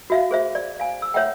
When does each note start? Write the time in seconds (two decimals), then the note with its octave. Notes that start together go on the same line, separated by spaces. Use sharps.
0.10 F#4 E5 F5
0.31 G#4 C5 E5
0.55 D5
0.80 F5 G#5
1.02 E6
1.14 C#5 E5 F#5 G5